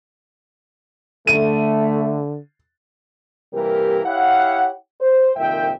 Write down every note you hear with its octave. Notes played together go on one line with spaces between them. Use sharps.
D3 A3 D#7
C3 E3 G3 A#3 G4 A#4
E4 G4 C#5 F5 F#5
C5
C2 F2 A#2 D#3 E5 G5